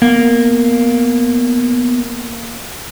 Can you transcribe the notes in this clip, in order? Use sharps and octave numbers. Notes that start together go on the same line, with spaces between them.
A#3 B3